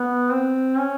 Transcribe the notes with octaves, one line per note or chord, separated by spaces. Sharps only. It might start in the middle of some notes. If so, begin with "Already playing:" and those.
Already playing: B3
C4
C#4